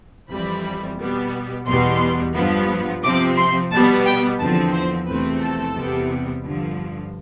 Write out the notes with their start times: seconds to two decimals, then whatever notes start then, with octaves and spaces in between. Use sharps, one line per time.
0.30 F2 E3 G3 C4 B5
0.98 B2 G3 B3
1.66 E2 B2 G3 B3 C6
2.34 G2 F3 B3
3.03 C3 F3 C4 D6
3.36 C6
3.70 B2 G3 B3 A5
4.05 G5
4.39 E2 D3 F3 C4 A5
4.73 C5
5.07 E2 C3 F3 A3 C4 B4
5.40 A4
5.75 E2 C3 G3 B3
6.43 G2 D3 F3